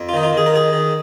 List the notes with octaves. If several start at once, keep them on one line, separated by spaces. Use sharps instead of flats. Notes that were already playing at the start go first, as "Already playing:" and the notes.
Already playing: F2
F4
D#3 D#4
F4
D#3 G#4
A#4
D#3 G#4
D#3